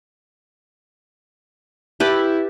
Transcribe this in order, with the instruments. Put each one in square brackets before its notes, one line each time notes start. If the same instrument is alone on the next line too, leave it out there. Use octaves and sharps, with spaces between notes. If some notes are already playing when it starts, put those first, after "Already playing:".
[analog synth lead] E4 [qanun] G4 B4 A5